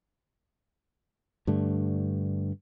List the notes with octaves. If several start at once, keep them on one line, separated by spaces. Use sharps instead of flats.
G2 D3 A3